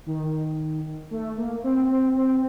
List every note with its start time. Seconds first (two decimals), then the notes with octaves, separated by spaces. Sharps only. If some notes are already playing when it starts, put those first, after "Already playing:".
0.06 D#3
1.11 A3
1.37 A#3
1.64 C4
1.90 C4
2.16 C4